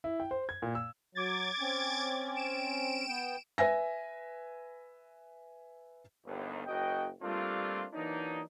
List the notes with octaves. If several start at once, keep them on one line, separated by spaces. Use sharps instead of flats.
E4
G5
C5
G#6
A#2
E6
F#3 D6 G#6 A6
C4 C#4
D7 E7
B3 G5
B4 E5 G#5 A#6
G1 D#2
F#1 F#4 D#5 G5
G3 A3 A#3 C4 D4 F4
E3 F#3 A#3 D4 D#4